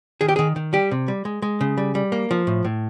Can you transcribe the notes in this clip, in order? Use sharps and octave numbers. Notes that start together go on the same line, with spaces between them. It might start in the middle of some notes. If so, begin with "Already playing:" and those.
D#3 G#4
G4
D#3 G#4
D#3
G3 G4
C3
G3
G#3
G#3
C#3
G3
G3
A#3
F3
A2
A2